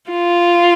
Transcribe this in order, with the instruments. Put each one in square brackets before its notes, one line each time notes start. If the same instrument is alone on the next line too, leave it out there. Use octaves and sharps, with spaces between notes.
[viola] F4